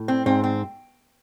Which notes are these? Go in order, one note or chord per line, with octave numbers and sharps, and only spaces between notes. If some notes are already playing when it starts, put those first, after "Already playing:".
Already playing: A2
C4
G#2 C4
C4